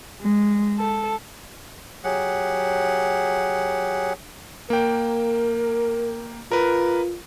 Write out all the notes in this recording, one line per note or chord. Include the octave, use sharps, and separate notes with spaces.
G#3
A4
F#3 G4 G#4 F#5
A#3 A#4 G5
F4 A#4 B4